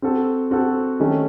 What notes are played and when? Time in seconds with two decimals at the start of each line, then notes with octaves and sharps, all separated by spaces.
0.02 C4 F#4 A4
0.51 C4 F#4 A4
1.00 D#3 A3 C#4